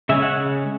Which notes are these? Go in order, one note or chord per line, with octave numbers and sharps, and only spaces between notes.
C#3 G#3 C#4 E5
F#5